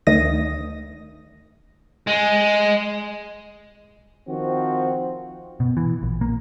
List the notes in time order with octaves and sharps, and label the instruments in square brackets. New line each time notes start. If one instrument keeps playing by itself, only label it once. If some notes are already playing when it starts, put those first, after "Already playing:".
[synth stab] D2 D#3 D#6 A#6
[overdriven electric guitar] G#3
[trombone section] D#3 F3 C4 F#4
[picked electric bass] B2
E3
A#1
A#3